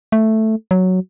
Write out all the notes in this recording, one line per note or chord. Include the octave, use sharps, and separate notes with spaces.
A3
F#3